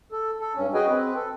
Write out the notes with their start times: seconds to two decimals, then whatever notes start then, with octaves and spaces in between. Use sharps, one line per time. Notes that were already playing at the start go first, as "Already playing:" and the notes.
0.12 A4
0.40 A4
0.55 G2 C#4
0.74 F#4 G#4 B4 D#5 G5 G#5
0.89 C4 B4
1.15 A4